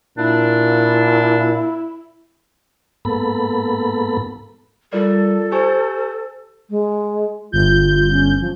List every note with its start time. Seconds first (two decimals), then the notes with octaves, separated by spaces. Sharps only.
0.18 A#2 D4 E4
3.05 G#2 A#3 B3 A4 B5
4.93 G3 F4 A4 A#4 D5
5.52 G4 C5 G#5 C#6
6.70 G#3
7.52 G1 F4 G6
8.11 C#4
8.41 F3